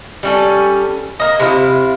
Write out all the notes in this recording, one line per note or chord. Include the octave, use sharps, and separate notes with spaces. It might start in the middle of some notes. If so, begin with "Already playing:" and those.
G3 C#4 A4
A#3 D#5
C3 E4 F4